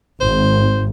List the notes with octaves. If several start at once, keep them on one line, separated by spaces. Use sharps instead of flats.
G#1 C5